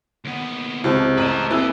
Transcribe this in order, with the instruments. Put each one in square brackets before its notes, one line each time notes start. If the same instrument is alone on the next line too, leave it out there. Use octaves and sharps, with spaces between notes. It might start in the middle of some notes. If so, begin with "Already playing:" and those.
[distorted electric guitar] D#2 B3
[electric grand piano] C#2 [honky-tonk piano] C3 G4 A5 [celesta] E4 C5
[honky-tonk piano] A1 A#5 D#7 [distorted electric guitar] B4 A5
[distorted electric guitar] A#3 G4 [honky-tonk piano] C4 E4 G#4 [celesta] E6 F#6 A6